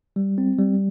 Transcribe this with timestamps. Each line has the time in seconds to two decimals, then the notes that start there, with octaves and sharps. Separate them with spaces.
0.16 G3
0.38 C4
0.59 G3